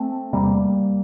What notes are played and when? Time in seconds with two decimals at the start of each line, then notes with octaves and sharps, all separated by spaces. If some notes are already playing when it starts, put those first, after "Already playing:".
Already playing: A3 C4
0.33 E2 C3 G3 A#3